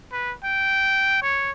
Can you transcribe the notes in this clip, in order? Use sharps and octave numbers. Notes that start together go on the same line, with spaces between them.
B4
G5
C#5